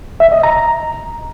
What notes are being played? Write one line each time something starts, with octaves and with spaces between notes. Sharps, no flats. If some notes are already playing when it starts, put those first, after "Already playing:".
E5
D#5
A#5